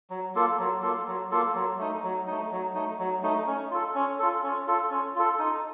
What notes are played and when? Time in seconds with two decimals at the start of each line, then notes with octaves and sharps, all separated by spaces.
0.10 F#3
0.35 A#3 F4 A4
0.59 F#3
0.82 A#3 F4 A4
1.07 F#3
1.31 A#3 F4 A4
1.55 F#3
1.78 A3 D#4
2.03 F#3
2.27 A3 D#4
2.51 F#3
2.75 A3 D#4
2.99 F#3
3.23 A3 D#4
3.47 C#4
3.71 F4 A4
3.95 C#4
4.19 F4 A4
4.43 C#4
4.67 F4 A4
4.91 C#4
5.15 F4 A4
5.39 D#4